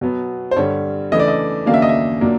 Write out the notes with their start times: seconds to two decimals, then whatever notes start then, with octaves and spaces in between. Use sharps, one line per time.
0.01 B2 F#3 B3
0.51 C5
0.56 G2 D3 G3 C#5
1.12 C#3 E3 A3 D4 D#5
1.19 D5
1.28 D#5
1.66 D#2 C#3 F#3 A#3 D4 F5
1.74 E5
1.82 D#5
1.89 E5
2.21 A#2 F#3 A#3 D4